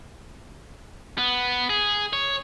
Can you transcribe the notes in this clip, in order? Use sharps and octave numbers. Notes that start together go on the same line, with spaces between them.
B3
G#4
C#5